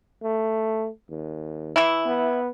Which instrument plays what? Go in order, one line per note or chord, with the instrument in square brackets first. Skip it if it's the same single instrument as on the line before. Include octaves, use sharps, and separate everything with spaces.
[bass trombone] A3
D#2
[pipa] E3 E4
[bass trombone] B3